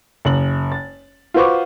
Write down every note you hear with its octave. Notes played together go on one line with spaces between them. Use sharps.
F#1 F#7
A6
F4 F#4 B4 C5 C#6 D6